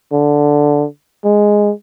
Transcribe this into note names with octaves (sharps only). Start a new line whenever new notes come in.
D3
G#3